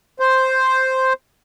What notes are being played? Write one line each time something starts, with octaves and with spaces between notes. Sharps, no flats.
C5